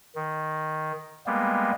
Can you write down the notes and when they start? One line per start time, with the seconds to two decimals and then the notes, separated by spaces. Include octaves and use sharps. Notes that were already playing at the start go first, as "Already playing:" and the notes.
0.16 D#3
1.26 G3 G#3 A#3 B3